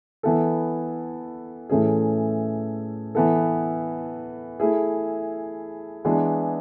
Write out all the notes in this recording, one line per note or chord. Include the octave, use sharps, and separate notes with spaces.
E3 B3 E4 A4
A2 E3 A3 C#4 G#4
E3 B3 E4 A4
A3 E4 G#4
E3 G#3 B3 D4 G#4